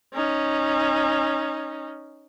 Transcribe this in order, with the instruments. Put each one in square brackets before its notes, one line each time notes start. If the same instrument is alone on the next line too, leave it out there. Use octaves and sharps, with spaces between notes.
[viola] C#4 D#4